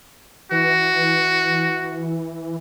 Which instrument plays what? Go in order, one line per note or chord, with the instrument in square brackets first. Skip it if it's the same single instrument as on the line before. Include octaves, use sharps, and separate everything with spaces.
[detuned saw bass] E3 [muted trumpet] F#4